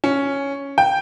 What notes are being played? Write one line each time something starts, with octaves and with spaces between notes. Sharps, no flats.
C#4
G5